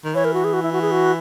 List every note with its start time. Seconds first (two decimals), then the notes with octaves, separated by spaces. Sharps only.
0.04 D#3
0.15 E3 C#5
0.24 A#4
0.34 F#4
0.44 G#4
0.53 F#4
0.63 E4
0.72 F#4
0.82 G#4
0.91 F#4